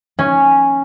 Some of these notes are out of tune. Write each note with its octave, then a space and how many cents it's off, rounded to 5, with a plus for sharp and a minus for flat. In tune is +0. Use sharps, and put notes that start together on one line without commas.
C#4 -5